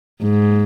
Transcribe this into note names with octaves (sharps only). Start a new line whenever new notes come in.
G#2